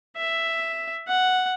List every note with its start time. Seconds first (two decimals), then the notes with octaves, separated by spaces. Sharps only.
0.17 E5
1.08 F#5